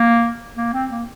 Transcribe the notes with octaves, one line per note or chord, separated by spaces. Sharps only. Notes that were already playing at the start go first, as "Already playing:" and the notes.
Already playing: A#3
A#3
C4
A#3